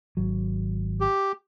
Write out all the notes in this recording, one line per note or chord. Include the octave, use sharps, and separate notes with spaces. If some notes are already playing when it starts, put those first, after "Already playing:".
G#1 F#3
G4